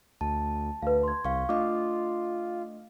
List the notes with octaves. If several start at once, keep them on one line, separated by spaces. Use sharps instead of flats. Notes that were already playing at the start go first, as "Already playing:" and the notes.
D2 A5
D2 B4 F5
C6 G#6
C2 F5 C#6
A3 D4 F4 D#5 D6